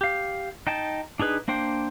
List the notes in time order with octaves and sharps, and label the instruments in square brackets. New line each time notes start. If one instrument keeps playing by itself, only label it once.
[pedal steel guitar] G4 F5
D#4 G5 A5
D4 D#4 G#4 B4
A#3 D4 C5 G5